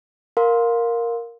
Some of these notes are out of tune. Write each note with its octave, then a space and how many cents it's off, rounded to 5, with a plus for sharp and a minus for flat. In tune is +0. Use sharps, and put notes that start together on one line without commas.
A#4 +0 F5 +20 C6 -5